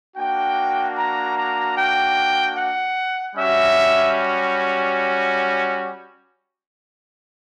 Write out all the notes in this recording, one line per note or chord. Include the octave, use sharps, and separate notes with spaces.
A#3 D4 F#4 G5
A#5
A#5
G5
F#5
G3 C#4 F#4 E5